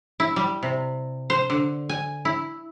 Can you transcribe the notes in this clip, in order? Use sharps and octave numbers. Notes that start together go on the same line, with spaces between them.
E4
G3
C3
C5
D3
G#5
E4